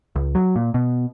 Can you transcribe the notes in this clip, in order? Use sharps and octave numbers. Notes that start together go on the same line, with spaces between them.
C#2
F#3
A#2
B2